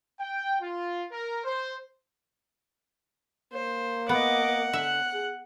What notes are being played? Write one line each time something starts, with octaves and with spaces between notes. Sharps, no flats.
G5
F4
A#4
C5
A#3 C5
B3 D#5 F#5 D6
D3 E5 F#6
G#4